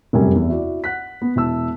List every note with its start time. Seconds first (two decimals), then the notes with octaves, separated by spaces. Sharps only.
0.13 F1 F#2 C3 G3 G#5
0.35 E2
0.49 E4 F#4 D5
0.84 F#5 F#6 B6
1.22 B3
1.36 E1 E4 A5 E6